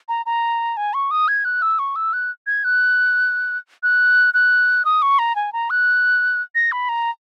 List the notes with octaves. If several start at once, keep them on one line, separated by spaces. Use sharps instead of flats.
A#5
A#5
G#5
C#6
D#6
G#6
F#6
E6
C#6
E6
F#6
G#6
F#6
F#6
F#6
D#6
C#6
A#5
G#5
A#5
F#6
A#6
B5
A#5